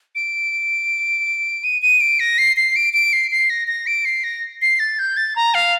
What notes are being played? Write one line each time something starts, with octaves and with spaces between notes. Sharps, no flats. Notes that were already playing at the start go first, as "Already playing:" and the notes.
D7
D#7
D#7
D7
A#6
C7
C7
D7
D7
C7
C7
A#6
A#6
D7
C7
A#6
C7
A6
G6
A6
A#5
F5